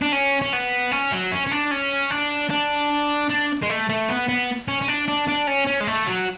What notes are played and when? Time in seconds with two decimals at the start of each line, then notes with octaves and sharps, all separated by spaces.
0.02 D4
0.12 C#4
0.41 C#4
0.53 B3
0.91 C#4
1.12 F#3
1.31 C#4
1.46 C#4
1.51 D4
1.71 C#4
2.11 D4
2.50 D4
3.30 D4
3.63 G#3
3.70 A3
3.89 A3
4.09 B3
4.29 B3
4.68 C#4
4.82 C#4
4.88 D4
5.08 D4
5.28 D4
5.47 C#4
5.67 C#4
5.81 G#3
5.87 A3
6.07 F#3